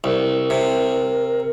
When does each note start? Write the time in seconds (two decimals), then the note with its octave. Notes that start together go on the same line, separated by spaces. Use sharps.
0.04 C2 A#4
0.50 C3